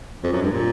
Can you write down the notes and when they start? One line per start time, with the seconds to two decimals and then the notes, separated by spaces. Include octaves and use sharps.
0.23 F2
0.32 F#2
0.42 G2
0.51 A#2